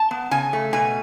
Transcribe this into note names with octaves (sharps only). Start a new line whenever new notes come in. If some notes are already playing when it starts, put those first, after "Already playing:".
Already playing: A5
B3
C#3 G#5
A3
B2 G#5